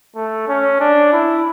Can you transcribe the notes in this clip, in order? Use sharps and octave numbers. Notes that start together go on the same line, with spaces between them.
A3
C#4
D4
E4